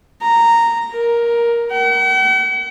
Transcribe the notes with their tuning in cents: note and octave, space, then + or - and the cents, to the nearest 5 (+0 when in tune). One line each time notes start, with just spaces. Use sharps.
A#5 -10
A#4 +10
F#5 +45